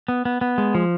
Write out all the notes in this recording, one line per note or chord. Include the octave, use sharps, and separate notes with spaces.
B3
B3
B3
G#3
F3